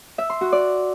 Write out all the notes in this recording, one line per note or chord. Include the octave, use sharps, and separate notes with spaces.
E5
C6
F#4
D5